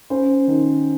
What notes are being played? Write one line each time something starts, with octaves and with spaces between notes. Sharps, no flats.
C#4 C5
D#3